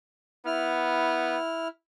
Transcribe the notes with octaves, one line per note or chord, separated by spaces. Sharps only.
B3 E4 F6